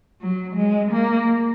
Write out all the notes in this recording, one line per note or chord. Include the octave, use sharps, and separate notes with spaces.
F#3
G#3
A#3